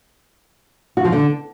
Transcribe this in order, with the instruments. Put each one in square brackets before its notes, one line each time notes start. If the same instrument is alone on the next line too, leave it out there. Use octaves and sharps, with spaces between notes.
[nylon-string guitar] F#4
F3
D3